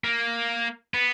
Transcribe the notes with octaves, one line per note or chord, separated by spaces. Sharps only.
A#3
B3